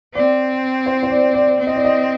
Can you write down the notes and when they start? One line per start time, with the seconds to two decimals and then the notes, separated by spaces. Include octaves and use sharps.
0.15 C4 D5
0.86 C5
1.03 C5
1.10 D5
1.34 D5
1.59 C4
1.67 D#5
1.76 D5
1.85 D#5